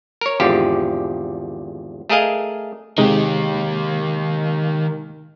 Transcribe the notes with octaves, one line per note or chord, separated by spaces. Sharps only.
A#4 C#5
G#1 E2 D3 F3 G4
A3 G#4 A#4 D#5 F5 G#5
C3 D#3 G#3 D#4 G4